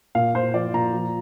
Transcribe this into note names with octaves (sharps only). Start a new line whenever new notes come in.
A#2 F5
A#2 C5
F3 D5
A#2 A#5
F3